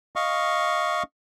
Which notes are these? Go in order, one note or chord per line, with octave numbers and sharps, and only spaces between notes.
D#5 F5 C#6